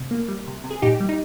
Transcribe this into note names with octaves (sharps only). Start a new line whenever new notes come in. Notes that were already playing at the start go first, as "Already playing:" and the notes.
Already playing: C3
A#3
G3
C3
C3
G#4
A#2 D#4 G4
G3
D#4